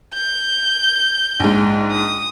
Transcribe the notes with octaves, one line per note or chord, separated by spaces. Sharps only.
G6
A#1 G#2
D#6